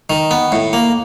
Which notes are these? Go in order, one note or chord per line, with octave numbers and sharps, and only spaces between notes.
D#3
B3
A2
A#3